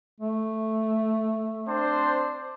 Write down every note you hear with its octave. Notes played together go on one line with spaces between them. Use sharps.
A3
C4 D4 C5